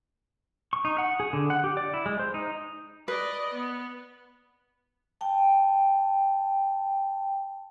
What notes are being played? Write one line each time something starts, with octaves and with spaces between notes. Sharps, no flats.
C#6
D#4
F#5
G#4
D3
F#5
G4
D5
E4
G#3
C5
D#4
B4 D5 D#5
B3
G5 A5